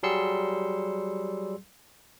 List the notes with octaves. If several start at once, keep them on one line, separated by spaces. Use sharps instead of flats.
F#3 G3 G#4 C6 E6 C#7